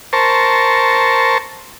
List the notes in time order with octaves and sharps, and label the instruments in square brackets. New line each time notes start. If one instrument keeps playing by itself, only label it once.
[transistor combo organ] A#4 C5 A5 C#6